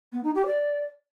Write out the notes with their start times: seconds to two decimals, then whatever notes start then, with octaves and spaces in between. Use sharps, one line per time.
0.12 B3
0.23 D#4
0.34 G4
0.46 D5